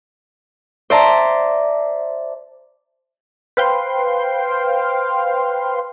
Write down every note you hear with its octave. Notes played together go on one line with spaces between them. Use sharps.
C5 D5 E5 A5 A#5
B4 C5 F5 G5 C6